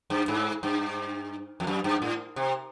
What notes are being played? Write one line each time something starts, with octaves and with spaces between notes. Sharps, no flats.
G2
G#2
G2
F2
F#2
G2
A2
C3